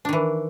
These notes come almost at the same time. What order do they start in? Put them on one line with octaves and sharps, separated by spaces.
D4 D#3 E3